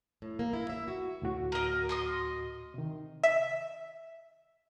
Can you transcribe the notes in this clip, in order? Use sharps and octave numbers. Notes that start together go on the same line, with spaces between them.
A2
A#3
E4
E5
F#4
D2 A2 F#4
A#4 D#5
D#5 C6 D#6
C3 D#3
E5